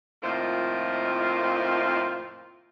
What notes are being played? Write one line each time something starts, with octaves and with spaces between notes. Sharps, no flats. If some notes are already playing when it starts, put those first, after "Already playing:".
F2 A2 D#3 A#3 F4 C5